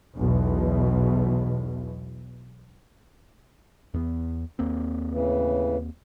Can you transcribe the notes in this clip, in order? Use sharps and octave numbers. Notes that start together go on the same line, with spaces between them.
B1 E2 B2
E2 B3
D#2 A#3 C4
A2 C#3 E3